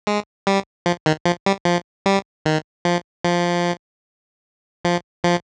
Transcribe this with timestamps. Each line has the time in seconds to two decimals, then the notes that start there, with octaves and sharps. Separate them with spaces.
0.07 G#3
0.47 G3
0.86 F3
1.06 D#3
1.25 F3
1.46 G3
1.65 F3
2.06 G3
2.46 D#3
2.85 F3
3.24 F3
4.85 F3
5.24 F3